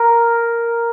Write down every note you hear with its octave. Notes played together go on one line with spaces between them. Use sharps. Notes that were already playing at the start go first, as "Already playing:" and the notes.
Already playing: A#4